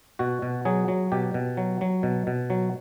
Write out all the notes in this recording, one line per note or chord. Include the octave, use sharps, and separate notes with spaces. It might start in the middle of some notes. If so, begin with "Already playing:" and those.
B2 F#4
B2
F#3 G#4
F#3
B2 G4
B2
F#3
F#3
B2
B2
F#3